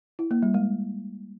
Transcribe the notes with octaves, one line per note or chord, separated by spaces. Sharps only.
E4
A#3
G3
G#3